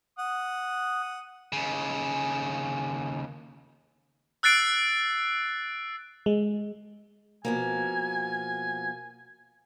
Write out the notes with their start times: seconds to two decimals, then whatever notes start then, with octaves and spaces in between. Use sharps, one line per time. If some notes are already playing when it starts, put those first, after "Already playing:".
0.19 F#5 D#6
1.53 D#2 C#3
4.43 E6 F#6 A6 C7 D7
6.26 G#3
7.45 B2 F3 A#3 G#5